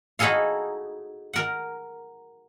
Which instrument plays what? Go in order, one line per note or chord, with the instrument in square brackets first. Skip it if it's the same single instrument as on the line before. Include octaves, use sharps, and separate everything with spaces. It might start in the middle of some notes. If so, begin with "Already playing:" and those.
[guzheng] D#4 E4 F#4 G#4 A4 F5
A#4 F#5